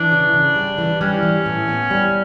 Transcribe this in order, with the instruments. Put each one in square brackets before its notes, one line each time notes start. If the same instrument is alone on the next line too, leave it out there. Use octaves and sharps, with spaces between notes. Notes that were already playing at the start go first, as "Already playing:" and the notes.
Already playing: [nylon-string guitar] E3 [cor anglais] D4
[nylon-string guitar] C#3
C#3
G3
E3
[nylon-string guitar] G3 [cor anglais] C#4
[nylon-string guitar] E3
A2
B3
G3